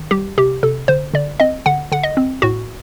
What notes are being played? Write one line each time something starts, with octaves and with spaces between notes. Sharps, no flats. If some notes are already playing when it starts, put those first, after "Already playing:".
Already playing: D#3
G3 G4
C3 G4
C3 A4
D3 C5
D3 D5
C4 D#5
D3 F#5
D3 F#5
D#5
C4
A2 F#4